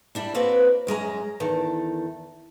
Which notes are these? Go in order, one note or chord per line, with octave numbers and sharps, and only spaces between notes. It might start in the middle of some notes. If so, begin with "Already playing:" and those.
G3 D4 E4
A#3 C4 F#4 A#4 B4 D5
F#2 G#3 C#4 A#5
E2 D#3 A4